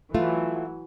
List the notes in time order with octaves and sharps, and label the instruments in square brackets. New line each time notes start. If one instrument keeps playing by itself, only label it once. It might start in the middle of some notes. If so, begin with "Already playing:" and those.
[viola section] E3 F#3 [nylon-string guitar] A3 F4